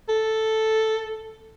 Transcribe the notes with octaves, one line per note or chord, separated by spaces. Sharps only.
A4